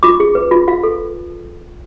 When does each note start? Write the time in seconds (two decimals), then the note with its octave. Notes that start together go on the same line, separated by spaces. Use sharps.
0.03 F4 D6
0.20 G#4
0.35 B4
0.51 F4
0.68 F4 F5
0.84 A4